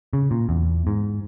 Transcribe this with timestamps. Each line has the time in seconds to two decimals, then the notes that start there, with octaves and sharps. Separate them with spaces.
0.13 C#3
0.31 A#2
0.49 E2
0.87 G#2